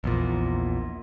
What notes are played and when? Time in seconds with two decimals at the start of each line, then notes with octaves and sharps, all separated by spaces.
0.04 A#1 E2 A#2